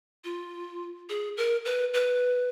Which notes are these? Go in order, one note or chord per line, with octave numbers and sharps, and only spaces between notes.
F4
G#4
A#4
B4
B4